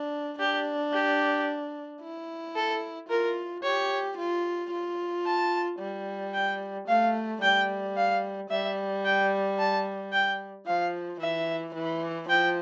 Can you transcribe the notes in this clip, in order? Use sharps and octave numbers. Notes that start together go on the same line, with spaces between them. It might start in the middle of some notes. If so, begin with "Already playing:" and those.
Already playing: D4
D4 G4
G4
E4
A4
F4 A#4
G4 C#5
F4
F4
A5
G3
G5
A3 F5
G3 G5
F5
G3 E5
G5
A5
G5
F3 F5
E3 E5
E3
F3 G5